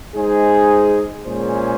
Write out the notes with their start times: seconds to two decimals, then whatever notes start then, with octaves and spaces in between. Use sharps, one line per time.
0.13 G#3 D#4 G#4 C5
1.25 A#2 G#3 C#4 G#4 C5